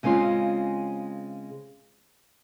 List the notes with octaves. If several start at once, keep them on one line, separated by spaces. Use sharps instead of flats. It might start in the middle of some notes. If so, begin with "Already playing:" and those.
C#3 G#3 C4 C#4 F4